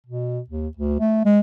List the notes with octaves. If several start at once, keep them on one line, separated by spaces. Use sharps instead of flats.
B2
D#2
D2
A3
G#3